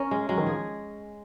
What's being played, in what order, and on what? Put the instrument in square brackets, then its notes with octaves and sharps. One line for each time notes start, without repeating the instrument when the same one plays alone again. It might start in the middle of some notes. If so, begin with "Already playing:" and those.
Already playing: [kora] C#4 A#4
G#3
[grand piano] F#3 [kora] G#3
[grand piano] D#3
[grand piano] F3 [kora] G#4